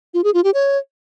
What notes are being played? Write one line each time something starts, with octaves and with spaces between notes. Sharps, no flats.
F4
G#4
F4
G4
C#5